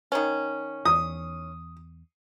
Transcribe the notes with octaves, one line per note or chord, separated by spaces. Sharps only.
D#3 C#4
E2 D#6